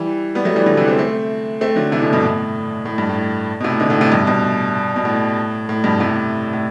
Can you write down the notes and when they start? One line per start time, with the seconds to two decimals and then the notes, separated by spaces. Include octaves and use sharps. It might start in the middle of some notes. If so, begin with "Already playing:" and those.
Already playing: E3 G3
0.35 G3 B3
0.45 F#3 A3
0.56 E3 G3
0.66 D3 F#3
0.77 C3 E3
0.87 A3 C4
0.99 A3 C4
1.61 A3 C4
1.76 D3 F#3
1.92 C3 E3
2.02 B2 D3
2.13 G2 B2
2.23 A2
2.86 A2
2.98 G2
3.09 A2
3.60 B2
3.64 A2 C3
3.80 B2 D3
3.90 A2 C3
4.01 A2 C3
4.12 G2 B2
4.27 G2 B2
4.96 B2
5.05 A2
5.69 A2
5.84 G2 B2
6.00 A2 C3
6.53 A2